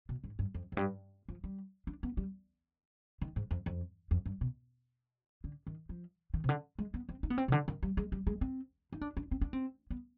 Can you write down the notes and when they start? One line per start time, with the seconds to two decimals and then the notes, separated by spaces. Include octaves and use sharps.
0.09 B2
0.24 G#2
0.39 G2
0.54 F2
0.72 F2
0.77 G2
1.29 F3
1.44 G3
1.87 D4
2.03 B3
2.17 G3
3.21 D#3
3.36 G#2
3.51 F2
3.66 F2
4.11 F2
4.26 G2
4.41 B2
5.44 D3
5.67 D#3
5.89 F3
6.34 D#3
6.44 C3
6.49 D3
6.79 G#3
6.94 B3
7.09 C4
7.23 D#4
7.30 B3
7.38 C4
7.48 C3
7.52 D3
7.68 D#3
7.82 G3
7.97 G#3
8.12 G3
8.27 G#3
8.41 C4
8.92 D#4
9.01 D4
9.17 D4
9.31 C4
9.41 D4
9.53 C4
9.90 B3